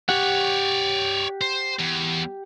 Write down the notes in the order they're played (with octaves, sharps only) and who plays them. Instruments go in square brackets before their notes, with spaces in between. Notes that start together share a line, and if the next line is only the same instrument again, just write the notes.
[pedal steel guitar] G4 F#5 [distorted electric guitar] C#5 D5
[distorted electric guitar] C5
E2